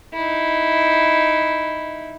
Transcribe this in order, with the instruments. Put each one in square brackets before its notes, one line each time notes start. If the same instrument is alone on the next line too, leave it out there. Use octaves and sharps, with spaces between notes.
[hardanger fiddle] D#4 E4